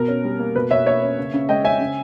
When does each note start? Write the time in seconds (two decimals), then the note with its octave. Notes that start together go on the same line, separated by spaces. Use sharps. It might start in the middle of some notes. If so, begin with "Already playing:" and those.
Already playing: B2 B3 A#4
0.08 C#4
0.24 G3
0.40 A#3
0.56 B2 B4
0.71 B2 C#5 E5
0.86 A#3 C#5 E5
1.02 C#4
1.18 C#3
1.34 C#3
1.49 G#3 D#5 G5
1.64 C#4 E5 G#5
1.80 C#3